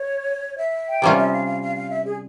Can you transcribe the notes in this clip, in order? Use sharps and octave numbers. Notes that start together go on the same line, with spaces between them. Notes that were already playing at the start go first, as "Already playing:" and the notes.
Already playing: C#5
E5
G5
C3 G3 C#4 F4 F5
E5
F5
F5
F5
F5
E5
G#4